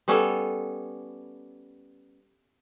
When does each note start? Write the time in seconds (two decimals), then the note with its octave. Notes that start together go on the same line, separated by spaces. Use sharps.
0.08 G3 B3 C#4 A4